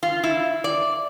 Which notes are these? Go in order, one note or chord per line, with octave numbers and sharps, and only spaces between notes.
F4
E4
D5